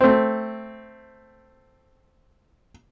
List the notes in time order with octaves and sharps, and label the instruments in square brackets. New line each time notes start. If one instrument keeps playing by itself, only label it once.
[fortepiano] A3 C4